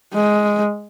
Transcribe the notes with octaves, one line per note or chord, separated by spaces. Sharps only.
G#3